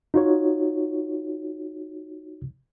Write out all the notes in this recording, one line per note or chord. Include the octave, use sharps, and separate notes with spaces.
D#4 F4 F#4 C#5